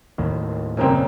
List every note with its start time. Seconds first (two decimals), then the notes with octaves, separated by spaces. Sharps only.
0.18 D#2 A2 D#3
0.77 F#2 A#2 C#3 G3 A#3 C4